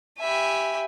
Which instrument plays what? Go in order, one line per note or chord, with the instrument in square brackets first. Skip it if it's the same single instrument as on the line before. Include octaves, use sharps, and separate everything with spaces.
[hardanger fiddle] G4 E5 [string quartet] G#5 B5